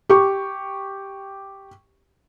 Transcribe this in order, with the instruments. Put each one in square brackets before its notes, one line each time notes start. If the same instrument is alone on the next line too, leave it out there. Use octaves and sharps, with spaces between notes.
[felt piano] G4 C#6